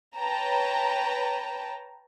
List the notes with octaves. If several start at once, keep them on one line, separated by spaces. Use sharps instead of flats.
B4 C#5 G5 A5 A#5